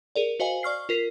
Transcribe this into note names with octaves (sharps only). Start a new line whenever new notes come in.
G#4 A#4 D5
F#4 C5 D#5 F5 G#5
D5 C#6 F6 C7
F4 A#4 B6 C7